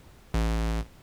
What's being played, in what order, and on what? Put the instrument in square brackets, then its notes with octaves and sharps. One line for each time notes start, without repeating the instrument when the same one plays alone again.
[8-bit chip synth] A1